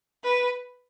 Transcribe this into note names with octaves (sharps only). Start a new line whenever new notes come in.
B4